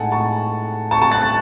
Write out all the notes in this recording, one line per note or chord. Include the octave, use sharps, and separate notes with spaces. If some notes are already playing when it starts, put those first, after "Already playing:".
Already playing: A2 G#3 D#4 F#5 G#5 A5
A5 C#6
A5 C#6
A5 C#6
F#6 A6
F#6 A6